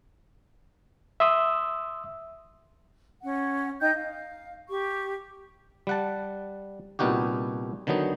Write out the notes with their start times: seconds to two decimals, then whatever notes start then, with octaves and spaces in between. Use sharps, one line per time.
1.20 E5 C6 D#6 E6
3.22 C#4 F#5
3.81 D#4 D#5 G5 G6
3.94 F5
4.69 G4 C#6
5.87 G3 F#5 A5
6.99 C2 A#2 B3 D#4 F#4 G4
7.87 D3 D#3 F#3 B3 D#4